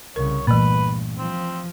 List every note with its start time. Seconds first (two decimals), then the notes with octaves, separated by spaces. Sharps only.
0.16 C2 C#3 A#4 C#5
0.47 G2 A#2 E3 A3 B4
1.18 F3 C4